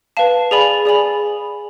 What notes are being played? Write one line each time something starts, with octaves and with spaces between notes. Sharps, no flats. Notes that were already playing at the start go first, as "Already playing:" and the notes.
B4 F5 A5
G#4 D5 G#5 B5
G#4 D5 G#5 B5